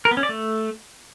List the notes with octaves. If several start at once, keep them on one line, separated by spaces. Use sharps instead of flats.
A#4
B3
C#4
D5
A3